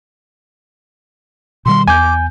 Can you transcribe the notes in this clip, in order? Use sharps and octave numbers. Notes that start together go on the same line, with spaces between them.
B2 D#3 G3 C6
E2 G#5 D6 G6